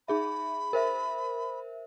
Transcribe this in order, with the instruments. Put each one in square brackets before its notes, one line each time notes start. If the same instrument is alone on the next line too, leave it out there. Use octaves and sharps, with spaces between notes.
[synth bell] D#4 G#4 E5 [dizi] B5
[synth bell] A#4 C5 E5